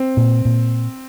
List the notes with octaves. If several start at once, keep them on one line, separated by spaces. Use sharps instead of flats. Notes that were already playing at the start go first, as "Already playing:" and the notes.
Already playing: C4
A#2
A#2